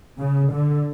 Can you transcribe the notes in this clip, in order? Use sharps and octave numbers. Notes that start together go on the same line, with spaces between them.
C#3
D3